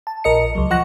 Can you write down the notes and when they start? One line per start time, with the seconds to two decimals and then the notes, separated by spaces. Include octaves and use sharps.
0.07 A5
0.24 A#1 A#4 D#5 C#7
0.55 C#2 F#3
0.71 F3 F#5 C#6 F#6 A#6